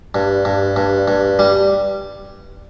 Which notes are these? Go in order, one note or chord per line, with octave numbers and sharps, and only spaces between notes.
G2
G2
G2
G2
G3